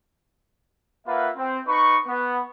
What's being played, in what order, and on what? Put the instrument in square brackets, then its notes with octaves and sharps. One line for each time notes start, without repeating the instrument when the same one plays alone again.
[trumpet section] A#3 F4 B4 E5 F#5
C4
D#4 B4 C#6
B3